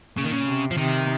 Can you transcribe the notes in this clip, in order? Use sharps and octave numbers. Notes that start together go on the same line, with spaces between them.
A#2 C#3
D#3
C#3
C3
F3
C3 D#3